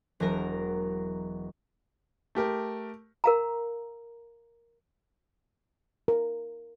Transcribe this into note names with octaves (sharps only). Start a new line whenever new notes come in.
E1 F#3 A#4 A#5
A3 G4 A#4
A#4 F5 A#5
A#4